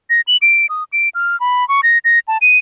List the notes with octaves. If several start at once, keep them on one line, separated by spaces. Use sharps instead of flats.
A#6
F#7
D7
D#6
D7
F6
B5
C#6
A#6
A#6
A5
D#7